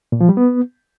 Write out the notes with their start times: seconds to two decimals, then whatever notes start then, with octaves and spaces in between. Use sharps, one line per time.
0.12 A#2
0.21 F3
0.29 G3
0.37 B3